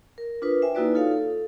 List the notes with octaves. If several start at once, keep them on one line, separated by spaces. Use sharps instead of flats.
A#4
D4 F4 A#4 B4 D#6
C5 E5 G5 G#5
A#3 D#4 E4 F#4 B4 D5
D#4 F4 A4 C#5 F5
A4